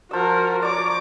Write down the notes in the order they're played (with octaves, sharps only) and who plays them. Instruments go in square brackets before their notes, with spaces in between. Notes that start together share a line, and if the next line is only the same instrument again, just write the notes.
[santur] F3 E6 [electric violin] F#4 A#4
[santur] C#5 D5 [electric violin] A#5 D6